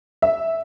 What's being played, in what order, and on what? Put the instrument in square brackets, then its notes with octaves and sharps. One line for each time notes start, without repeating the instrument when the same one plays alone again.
[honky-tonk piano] E5